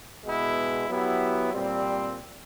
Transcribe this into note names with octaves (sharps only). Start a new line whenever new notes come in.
B2 G#3 B3 E4
F#3 B3 E4 G4
A#2 G3 C4